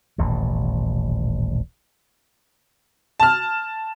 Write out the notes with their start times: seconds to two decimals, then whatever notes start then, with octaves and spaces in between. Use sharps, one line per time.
0.18 D#1 A1 B2
3.20 A5 F6